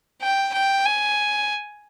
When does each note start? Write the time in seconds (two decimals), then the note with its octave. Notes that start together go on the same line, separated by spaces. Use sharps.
0.22 G5
0.53 G5
0.86 G#5